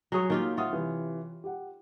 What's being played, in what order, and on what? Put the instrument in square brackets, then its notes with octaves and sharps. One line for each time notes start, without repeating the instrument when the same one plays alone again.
[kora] F#3 G#4 C#5 [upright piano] G#5 D#6
[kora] D#3 F4 G4 [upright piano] A#3
[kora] F4 C#5 [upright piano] E5 F#5 D#6
[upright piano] C3 E3
G4 F#5